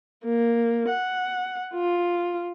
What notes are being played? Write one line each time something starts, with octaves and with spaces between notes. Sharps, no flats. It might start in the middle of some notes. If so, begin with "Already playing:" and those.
A#3
F#5
F4